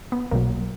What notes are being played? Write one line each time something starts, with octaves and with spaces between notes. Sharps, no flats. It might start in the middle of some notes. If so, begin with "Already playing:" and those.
B3
B1 B2 F#3 A#3